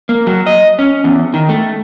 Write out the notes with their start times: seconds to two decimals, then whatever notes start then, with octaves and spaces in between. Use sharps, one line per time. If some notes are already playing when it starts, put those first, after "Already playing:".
0.09 A#3
0.27 F#3
0.46 D#5
0.79 C#4
1.04 E2
1.34 D#3
1.49 A3